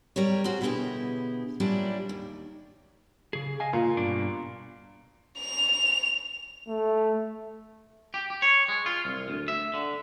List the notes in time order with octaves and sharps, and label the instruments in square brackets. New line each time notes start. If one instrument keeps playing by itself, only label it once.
[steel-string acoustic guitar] G3 A#4 C#5
F#4 G#4 A#4 C5
B2 D3 B3 E4 G4 G#4
A#2 F#3 G3 C#4 D4 E4
D#2
[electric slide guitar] C#3 G#4
D#5 F5 G#5
[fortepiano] A#2 [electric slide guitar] F4
[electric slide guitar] G2 B2 D4
[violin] F7
[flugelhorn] A3
[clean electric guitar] G4
G4
C#5
G#3
F4
C2
D2
E5
D3